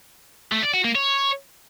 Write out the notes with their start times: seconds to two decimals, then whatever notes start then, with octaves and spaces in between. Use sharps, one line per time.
0.52 A3
0.63 D5
0.74 F#4
0.84 A#3
0.95 C#5